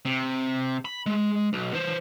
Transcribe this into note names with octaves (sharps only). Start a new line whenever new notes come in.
C3
B5
G#3
B1
E3 C5